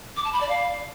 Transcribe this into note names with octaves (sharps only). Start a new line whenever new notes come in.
D6
A5
B5
D5
F5